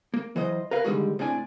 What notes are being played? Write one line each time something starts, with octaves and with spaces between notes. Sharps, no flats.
A#3
E3 F#3 C5 D#5
A#4 B4 F5
D3 D#3 G3 G#3 F#4
A2 C3 D4 G#5